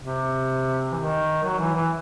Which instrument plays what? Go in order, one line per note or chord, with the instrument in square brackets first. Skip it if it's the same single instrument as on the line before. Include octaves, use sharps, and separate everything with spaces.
[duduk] C3
E3
D#3
F#3
E3
E3